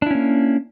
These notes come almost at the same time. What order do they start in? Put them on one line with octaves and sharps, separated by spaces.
D4 E4 C#4 A#3